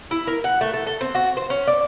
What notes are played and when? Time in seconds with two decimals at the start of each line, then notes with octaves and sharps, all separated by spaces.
0.11 E4
0.27 A#4
0.44 F#5
0.61 A3
0.74 A4
0.87 A4
1.01 C4
1.15 F#4
1.37 C5
1.50 C#4
1.67 D5